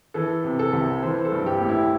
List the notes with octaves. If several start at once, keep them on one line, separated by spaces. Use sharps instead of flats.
E3 A4
C3
A4
C2
E3 C5
A4
G2
G4
A1
E4